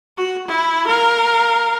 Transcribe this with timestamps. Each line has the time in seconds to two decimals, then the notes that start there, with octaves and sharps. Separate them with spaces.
0.17 F#4
0.47 E4
0.87 A#4 F5